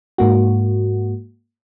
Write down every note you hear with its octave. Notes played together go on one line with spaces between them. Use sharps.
G#2 A#3 F#4